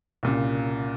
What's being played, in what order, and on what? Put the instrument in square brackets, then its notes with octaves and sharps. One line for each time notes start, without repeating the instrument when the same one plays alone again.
[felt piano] C2 A#2 C#3